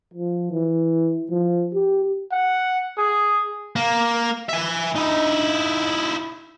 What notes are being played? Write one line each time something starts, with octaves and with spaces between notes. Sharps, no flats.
F3
E3
F3
G4
F#5
G#4
A#3
E5 G#5
D#4 E4